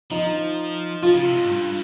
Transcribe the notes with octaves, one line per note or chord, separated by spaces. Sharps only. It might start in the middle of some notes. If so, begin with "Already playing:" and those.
F3 D#4
F3 F4
C#3
C3
G#2
G2